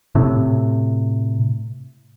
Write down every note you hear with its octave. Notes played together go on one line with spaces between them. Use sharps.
A2 C3